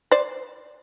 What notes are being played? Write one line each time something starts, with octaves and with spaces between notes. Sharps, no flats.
C5 D5